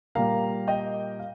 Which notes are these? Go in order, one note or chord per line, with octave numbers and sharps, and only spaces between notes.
A#2 G3 A#3 F5 A#5
D#5 G5
F5